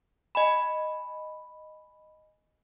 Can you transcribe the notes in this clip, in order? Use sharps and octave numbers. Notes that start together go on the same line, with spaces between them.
D#5 G#5 B5